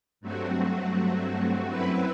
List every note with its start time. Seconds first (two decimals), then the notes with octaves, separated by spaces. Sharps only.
0.21 G2 F#3 A3 C4 F#4
1.69 F#2 F#3 C4 E4 B4